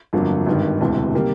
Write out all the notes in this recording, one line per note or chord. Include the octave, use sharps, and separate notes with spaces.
G1 F2 D3 F#3 A#3
G#1 G2 D#3
E1 D2 C3 E3
C3 D#3 G3 A#3